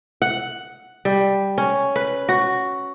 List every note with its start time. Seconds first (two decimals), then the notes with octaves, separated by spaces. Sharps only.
0.22 F#5
1.05 G3
1.58 C#4
1.96 B4
2.29 F#4